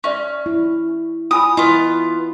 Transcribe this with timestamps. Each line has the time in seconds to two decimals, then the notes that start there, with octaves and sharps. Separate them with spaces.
0.04 C#4 D5 E5 C#6
0.46 E4
1.31 F4 G#5 B5 D#6
1.57 B3 E4 F4 D#5 C#6 D#6